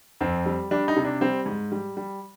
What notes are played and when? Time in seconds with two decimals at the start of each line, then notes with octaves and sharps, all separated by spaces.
0.21 F2 C4
0.46 G3
0.71 G3 D4
0.88 D#4
0.96 C3
1.05 D4
1.21 G3 C4
1.46 G#2
1.72 G3
1.97 G3